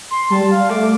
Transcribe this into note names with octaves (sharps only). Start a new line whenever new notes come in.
C6
G3 A5
F5
A3 D6